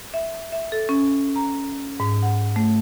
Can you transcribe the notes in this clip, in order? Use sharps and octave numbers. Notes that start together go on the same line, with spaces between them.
E5
E5
A4
C#4
A#5
G#2
F#5
A3